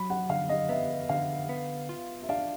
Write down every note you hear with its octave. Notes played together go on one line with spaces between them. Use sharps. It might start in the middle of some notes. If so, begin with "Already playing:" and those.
Already playing: F#3 B5
F#5
D3 F5
D#5
B3 E5
D3 F5
B3
F4
E5
D4 F5